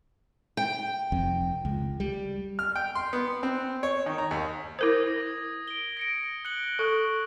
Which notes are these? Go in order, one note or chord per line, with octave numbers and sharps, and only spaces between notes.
G5
F1 F2
C#2
G3
F6
G5
C6
B3
C4
C#5
D#3
A#5
D#2
E4 A#4 C5 D#6 G#6 A#6
A#6
D7 G7
A#6 C#7 D7
F#6 C#7 F#7
A4 C#6 D#6